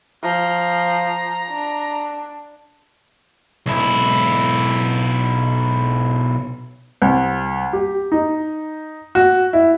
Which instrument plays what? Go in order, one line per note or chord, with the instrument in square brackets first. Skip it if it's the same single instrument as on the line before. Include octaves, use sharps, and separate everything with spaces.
[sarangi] F3 [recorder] A#5
[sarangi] D4
[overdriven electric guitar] B1 E4
[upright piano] C2
G4
D#4
F#4
E4